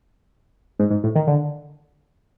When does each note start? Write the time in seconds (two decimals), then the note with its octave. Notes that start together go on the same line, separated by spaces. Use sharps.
0.79 G#2
0.90 G#2
1.04 A2
1.15 D#3
1.27 D3